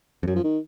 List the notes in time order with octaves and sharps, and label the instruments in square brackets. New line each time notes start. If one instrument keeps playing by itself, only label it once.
[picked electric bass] F2
[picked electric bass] F#2 [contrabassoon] F#3
[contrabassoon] F3
D#3